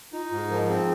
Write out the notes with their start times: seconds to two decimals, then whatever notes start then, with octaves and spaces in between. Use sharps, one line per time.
0.13 D#4 F4
0.25 F4
0.31 G#2
0.38 G#4
0.50 F3 A#4
0.70 C4 G#4